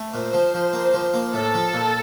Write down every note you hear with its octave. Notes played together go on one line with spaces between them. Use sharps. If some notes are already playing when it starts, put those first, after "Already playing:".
Already playing: A3
A#2 C5
F3
F3
A#3
F3
A#3
A2 A4
F3
A#2